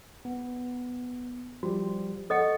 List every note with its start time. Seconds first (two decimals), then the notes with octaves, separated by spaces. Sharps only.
0.25 B3
1.63 F3 G3 F#4 G4
2.30 A4 D#5 F#5 C#6 C#7